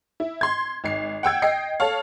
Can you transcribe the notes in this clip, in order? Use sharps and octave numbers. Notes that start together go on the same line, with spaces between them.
E4
C6 G#6
G#1 C7
F#5 G5 E6 G#6
D#5 G5 C7
A4 C#5 F5